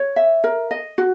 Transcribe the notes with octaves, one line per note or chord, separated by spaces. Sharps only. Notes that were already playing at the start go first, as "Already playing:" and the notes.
Already playing: C#5
E5
A#4
D#5
F#4